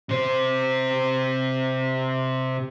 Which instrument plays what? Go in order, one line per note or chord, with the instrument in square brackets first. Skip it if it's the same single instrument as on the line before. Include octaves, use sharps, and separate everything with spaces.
[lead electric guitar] C3 C5